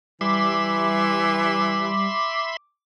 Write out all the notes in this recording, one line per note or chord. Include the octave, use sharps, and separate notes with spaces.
E3 G3 E5 B5 C6 D6